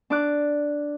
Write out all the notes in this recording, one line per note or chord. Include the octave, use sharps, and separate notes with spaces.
D4 D6 F#6